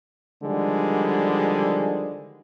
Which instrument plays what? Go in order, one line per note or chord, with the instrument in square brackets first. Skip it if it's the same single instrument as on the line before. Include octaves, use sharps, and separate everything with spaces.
[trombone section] D3 D#3 F3 G3 G#3